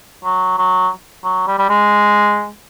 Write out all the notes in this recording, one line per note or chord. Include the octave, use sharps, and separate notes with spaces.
F#3
F#3
F#3
G3
G3
G#3